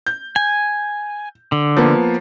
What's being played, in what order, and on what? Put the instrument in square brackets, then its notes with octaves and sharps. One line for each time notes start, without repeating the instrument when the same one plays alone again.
[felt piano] G6
[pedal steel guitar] G#5
D3
[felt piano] F3 A#3 B3